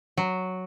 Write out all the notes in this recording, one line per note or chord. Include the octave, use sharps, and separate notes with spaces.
F#3